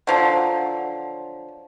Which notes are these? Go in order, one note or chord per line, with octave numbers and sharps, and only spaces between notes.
D3 F3 F#3